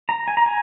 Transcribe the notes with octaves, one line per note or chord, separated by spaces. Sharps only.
A#5
G#5
A#5
G#5